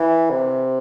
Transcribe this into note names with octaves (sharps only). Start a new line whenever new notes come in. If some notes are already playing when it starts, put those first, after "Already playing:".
Already playing: E3
C3